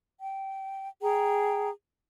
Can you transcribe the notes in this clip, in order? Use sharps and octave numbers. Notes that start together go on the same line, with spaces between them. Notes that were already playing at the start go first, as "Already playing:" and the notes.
G5
G#4 G5 A#5